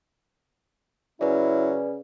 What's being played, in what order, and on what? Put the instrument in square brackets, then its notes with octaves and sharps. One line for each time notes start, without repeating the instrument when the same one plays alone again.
[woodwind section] C#3 C#4 [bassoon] F#3 [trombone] E4 [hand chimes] B4 D5